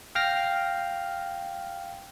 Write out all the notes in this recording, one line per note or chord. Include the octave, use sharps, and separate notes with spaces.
F5 G5 F6 A#6